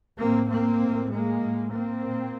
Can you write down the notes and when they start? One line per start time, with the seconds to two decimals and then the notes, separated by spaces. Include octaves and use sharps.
0.18 A2 A#3 C4
0.49 A#3 C4
0.81 A2
1.11 G#3 A#3
1.42 A2
1.72 A#3 C4
2.03 A#2